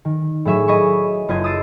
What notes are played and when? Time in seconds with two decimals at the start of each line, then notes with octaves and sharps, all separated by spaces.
0.05 D#3
0.45 A2 F#3 G#4 E5 C#6 E7
0.68 D#5 G#5 B5 C#6
1.28 F#1 F4 B4 C5 D#5 G#6
1.44 D#6 E6 A6 C7 D7 D#7